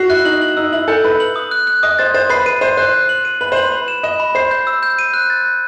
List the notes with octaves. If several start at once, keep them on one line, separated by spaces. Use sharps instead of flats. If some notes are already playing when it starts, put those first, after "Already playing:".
Already playing: F#4 C7
E4 F#6
D#4 F#7
F#7
D#4 E6
E4 F#7
A4 G6
B4 E6
F#7
D#6
F#6
F#6
D#5 D#6
C5 A6
C5 A6
B4 C7
B4 D#7
C5 C7
C5 F#6
F#6
F#7
D#7
B4 F#7
C5 F#7
B4
B5
E7
D#5 E7
B5
C5 C7
G6
E6
G6
D#7
F#6
A6
F#6